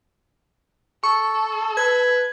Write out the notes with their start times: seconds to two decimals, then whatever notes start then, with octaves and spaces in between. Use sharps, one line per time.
1.04 A4 C#6
1.77 B4 G#6